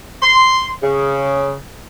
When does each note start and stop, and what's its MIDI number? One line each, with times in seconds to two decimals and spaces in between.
0.22 0.68 84
0.83 1.56 49